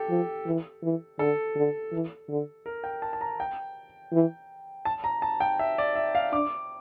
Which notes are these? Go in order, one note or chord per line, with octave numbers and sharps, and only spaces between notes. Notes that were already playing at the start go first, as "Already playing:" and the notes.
Already playing: G4 A4
F3
E3
E3
D3 A4
D3
E3
D3
A#4
G5
A5
A5
A#5
G5
E3
A5
A#5
A5
G5
E5
D5
E5
F5
D4 D6